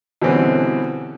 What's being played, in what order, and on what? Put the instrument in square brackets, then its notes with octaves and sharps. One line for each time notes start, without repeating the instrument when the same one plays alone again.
[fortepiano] B2 D3 E3 G3 C4 C#4